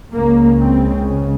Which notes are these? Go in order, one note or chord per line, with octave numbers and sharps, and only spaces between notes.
C#2 C#3 A#3
C4